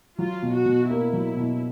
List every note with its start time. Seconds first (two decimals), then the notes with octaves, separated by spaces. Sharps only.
0.18 F#3 F4
0.43 B2
0.54 F#4
0.66 B2
0.89 A#3 E4
1.13 F#3
1.37 B2